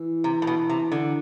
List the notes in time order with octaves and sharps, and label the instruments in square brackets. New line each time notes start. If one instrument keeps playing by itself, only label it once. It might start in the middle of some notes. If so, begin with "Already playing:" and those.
Already playing: [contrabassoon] E3
[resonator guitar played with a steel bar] C3
A2
B2
C3
D3